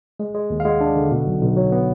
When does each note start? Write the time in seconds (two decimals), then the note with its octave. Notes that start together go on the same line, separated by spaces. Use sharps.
0.20 G#3
0.35 G#3
0.50 D#2
0.60 F5
0.65 G#3 F#5
0.81 D4
0.96 D3
1.11 B2
1.27 B1
1.42 B1
1.57 F#3
1.72 B3